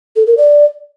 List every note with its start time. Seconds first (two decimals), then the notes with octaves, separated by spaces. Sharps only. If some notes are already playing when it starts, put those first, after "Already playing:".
0.16 A4
0.27 A#4
0.37 D5